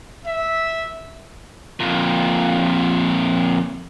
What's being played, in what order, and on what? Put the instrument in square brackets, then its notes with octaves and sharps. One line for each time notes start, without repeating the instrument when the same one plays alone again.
[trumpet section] E5
[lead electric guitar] F2 A#2